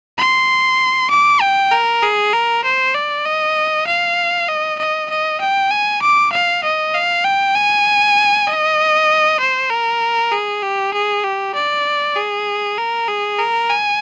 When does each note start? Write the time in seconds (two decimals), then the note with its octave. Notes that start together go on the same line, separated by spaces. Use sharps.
0.18 C6
1.10 D6
1.41 G5
1.71 A#4
2.02 G#4
2.33 A#4
2.64 C5
2.94 D5
3.26 D#5
3.87 F5
4.48 D#5
4.79 D#5
5.10 D#5
5.41 G5
5.71 G#5
6.02 D6
6.32 F5
6.64 D#5
6.94 F5
7.24 G5
7.55 G#5
8.48 D#5
9.40 C5
9.70 A#4
10.32 G#4
10.63 G4
10.93 G#4
11.24 G4
11.55 D5
12.16 G#4
12.78 A#4
13.08 G#4
13.39 A#4
13.70 G#5